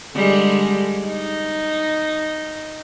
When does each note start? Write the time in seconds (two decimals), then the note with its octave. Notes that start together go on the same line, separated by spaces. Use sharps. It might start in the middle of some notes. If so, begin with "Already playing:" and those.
0.14 D3 G3 G#3
1.07 D#4